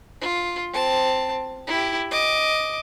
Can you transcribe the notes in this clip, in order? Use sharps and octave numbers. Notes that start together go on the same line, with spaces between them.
F4
C4 A5
E4 G4
D#5 D6